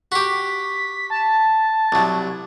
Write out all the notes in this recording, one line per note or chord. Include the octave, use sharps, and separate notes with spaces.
F#4 G4 B6
A5
C2 F#3